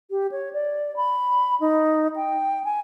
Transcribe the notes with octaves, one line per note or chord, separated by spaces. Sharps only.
G4
C#5
D5
B5
D#4
G5
G#5